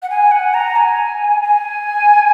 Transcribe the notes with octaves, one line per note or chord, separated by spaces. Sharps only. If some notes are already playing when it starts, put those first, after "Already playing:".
F#5
G#5
F#5
A#5
G#5
G#5